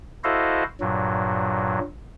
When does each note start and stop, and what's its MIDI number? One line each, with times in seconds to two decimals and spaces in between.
0.24 0.64 64
0.24 0.64 66
0.24 0.64 69
0.24 0.64 72
0.24 0.64 75
0.24 0.64 77
0.80 1.79 43
0.80 1.79 46
0.80 1.79 54